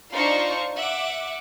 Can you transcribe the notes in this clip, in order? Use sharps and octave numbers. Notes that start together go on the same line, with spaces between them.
D4 D#4 F4 C5 F5 C#6
E5 F#5 D6